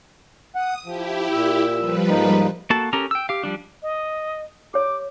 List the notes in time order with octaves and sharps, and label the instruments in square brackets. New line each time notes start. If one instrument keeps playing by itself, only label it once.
[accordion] F#5 [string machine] D#6
[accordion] F3 [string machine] E4 G4
[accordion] A#2 E6
[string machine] F3 G3 B4
[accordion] G#2 A#3 D#4
[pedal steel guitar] A#3 F#4 A4 A5
C#4 G4 A4 A#4 A#5
G5 E6
G4 F5
F3 G3 D4
[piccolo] D#5
[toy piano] G4 C#5 [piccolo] D6